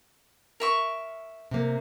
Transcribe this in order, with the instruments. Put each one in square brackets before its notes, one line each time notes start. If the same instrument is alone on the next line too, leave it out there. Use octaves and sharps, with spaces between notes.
[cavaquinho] A#4 E5 C#6
[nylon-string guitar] C3 A#3